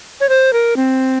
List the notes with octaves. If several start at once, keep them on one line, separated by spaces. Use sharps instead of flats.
C#5
C5
A#4
C4